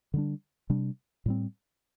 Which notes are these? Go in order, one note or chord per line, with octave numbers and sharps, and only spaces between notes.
D3 G3 D4
C3 G3 D4
A2 G3 C4